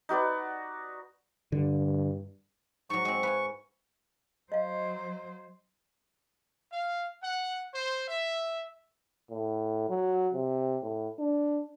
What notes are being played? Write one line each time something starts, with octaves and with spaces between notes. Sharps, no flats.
D#4 F#4 B4 D5
G2 D3
G#2 F#3 C#6
G#3 C4
B4 F5 G#5
F#3 C5 D#5 F5
F5
F#5
C5
E5
A2
F#3
C3
A2
D4